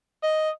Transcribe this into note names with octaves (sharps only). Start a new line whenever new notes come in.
D#5